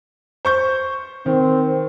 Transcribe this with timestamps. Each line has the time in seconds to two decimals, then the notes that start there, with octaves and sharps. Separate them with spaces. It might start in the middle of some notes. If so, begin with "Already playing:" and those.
0.45 C5 C#6 G6
1.26 D#3 C4